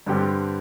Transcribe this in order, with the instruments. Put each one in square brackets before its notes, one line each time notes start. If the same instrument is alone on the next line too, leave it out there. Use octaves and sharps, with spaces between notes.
[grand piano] G2 D3 G3 C4 G4